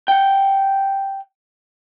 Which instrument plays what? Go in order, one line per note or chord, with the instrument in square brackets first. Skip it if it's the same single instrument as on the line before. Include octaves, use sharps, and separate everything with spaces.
[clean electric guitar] F#5 G5